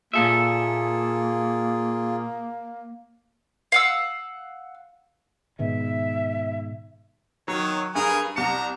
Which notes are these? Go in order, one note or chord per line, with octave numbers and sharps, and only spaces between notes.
A#2 A#3 F4 G#4 A4 E5
F5 F#5 E6
G#2 B2 D#3 E5
D#3 F#3 C#5
G2 G#4 A#4 G#5
C2 A#5 C#7